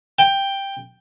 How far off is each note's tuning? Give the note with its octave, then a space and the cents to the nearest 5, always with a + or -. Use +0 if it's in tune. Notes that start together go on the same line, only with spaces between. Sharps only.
G5 +5